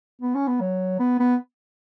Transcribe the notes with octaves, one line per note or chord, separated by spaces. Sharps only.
B3
C#4
B3
F#3
B3
B3